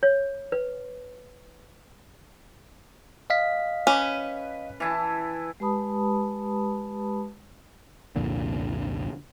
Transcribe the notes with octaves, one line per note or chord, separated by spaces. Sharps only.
C#5
B4
D#5 F5 B6
C#4 B4
E3 E4 A5
G#3 G4 B4 A5 B5 D#6
C2 F2 A#2 D3